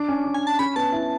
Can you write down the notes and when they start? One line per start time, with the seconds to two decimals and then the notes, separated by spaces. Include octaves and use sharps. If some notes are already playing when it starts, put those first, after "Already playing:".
Already playing: D4 D6
0.09 C#4
0.25 D4
0.34 G#5
0.47 A5
0.59 C#4 B5
0.76 B3 A5
0.92 E4